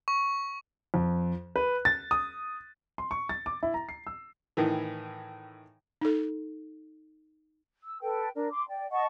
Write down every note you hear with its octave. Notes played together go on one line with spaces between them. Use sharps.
C#6
F2
B4
A6
D#6
C6
C#6
A6
D6
E4
A#5
C7
E6
A2 D#3 E3
D#4 A4
E6
A4 B4 G5
D4 A#4
C6 D6
D5 G5
D#5 F#5 A5 C#6